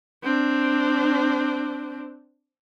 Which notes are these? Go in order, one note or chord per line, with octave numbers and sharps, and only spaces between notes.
C4 D4